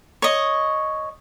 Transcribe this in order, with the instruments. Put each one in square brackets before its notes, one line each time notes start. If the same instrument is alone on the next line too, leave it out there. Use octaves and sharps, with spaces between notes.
[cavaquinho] C#5 D#5